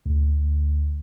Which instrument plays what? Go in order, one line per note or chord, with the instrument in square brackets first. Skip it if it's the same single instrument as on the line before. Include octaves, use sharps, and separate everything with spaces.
[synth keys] D2